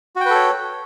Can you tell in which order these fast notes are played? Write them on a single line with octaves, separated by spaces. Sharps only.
F#4 G5 B4 A4 C#5